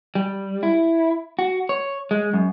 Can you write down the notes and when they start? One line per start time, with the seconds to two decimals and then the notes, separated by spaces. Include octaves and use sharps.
0.15 G3
0.63 E4
1.39 F#4
1.69 C#5
2.11 G#3
2.33 F#2